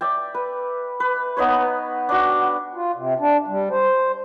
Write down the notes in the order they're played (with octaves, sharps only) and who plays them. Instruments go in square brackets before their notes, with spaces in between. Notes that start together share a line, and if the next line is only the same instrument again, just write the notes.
[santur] D5 E5 G5
B4
B4
B3 D#4 B4 C#5
D4 F#4
G5
[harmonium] F4
C3
D4
G3
C5